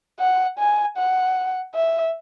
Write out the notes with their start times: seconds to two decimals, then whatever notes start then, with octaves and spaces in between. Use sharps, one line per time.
0.20 F#5
0.58 G#5
0.97 F#5
1.75 E5